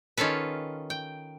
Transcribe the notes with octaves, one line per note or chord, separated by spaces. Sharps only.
D#3 C#4 F4 A4 B4
G5